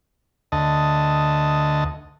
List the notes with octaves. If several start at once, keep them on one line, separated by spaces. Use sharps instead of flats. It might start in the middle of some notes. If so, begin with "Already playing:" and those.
D2 D#5 A5